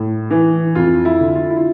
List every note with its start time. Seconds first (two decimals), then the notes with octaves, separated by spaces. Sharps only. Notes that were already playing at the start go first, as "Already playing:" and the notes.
Already playing: A2
0.30 E3
0.75 F2 F4
1.05 E4
1.20 D3
1.35 F4
1.50 E4
1.57 F4